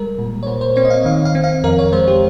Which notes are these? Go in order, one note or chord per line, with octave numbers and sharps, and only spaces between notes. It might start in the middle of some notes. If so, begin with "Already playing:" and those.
Already playing: G3 G#3 A#4
A#2
C#5
A#2 C5
C5
C4 C#5
D#5
F5
D#3 F5
F5
C4
F5
F2 A#4
C#5
G#3 C5
G4